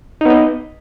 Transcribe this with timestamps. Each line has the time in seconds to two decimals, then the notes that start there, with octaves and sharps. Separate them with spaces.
0.21 D#4
0.25 B3
0.30 D#5